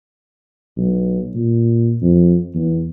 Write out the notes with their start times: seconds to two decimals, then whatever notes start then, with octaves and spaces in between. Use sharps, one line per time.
0.77 B1
1.35 A#2
2.02 F2
2.54 E2